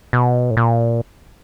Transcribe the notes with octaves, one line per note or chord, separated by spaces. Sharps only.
B2
A2
A#2